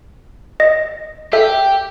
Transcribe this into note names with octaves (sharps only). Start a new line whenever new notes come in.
D#5
G4 A4 E5